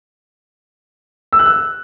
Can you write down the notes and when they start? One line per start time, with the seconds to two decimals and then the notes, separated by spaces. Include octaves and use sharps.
1.33 E6
1.39 F#6
1.46 E6